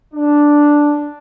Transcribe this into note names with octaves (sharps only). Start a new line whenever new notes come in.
D4